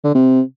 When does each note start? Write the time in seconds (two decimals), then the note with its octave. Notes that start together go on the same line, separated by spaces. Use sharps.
0.04 D3
0.15 C3